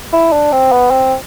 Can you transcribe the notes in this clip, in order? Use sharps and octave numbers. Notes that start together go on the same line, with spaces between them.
E4
D4
C4
B3
C4